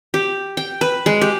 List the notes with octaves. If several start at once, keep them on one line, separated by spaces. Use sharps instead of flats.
G4
G5
B4
G#3
G4